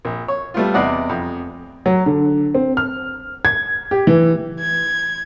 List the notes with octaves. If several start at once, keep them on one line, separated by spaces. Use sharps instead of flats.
A#1
C#5
G3 A3 B3 F4
E2 C3 D5 D#5 F#5
F2
F#3
D3
C4
F6
G#6
G4
E3
G#6